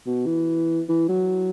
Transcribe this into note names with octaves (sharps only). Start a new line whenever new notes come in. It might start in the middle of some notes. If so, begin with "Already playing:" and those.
B2
E3
E3
F#3